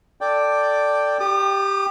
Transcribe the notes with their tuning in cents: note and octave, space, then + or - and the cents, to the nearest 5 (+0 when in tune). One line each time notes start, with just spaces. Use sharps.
A4 +5 D5 +0 G5 +0
G4 +0 D#6 -45